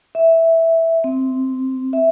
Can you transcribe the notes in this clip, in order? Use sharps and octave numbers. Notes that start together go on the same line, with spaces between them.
E5
C4
E5